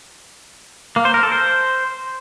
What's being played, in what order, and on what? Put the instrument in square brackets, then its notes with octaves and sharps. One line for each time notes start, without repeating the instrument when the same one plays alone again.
[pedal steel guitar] A#3
C5
A#4
A4
C5